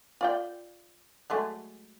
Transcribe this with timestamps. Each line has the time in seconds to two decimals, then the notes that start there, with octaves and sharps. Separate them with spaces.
0.21 F4 D5 G5
1.30 F#3 G#3 A3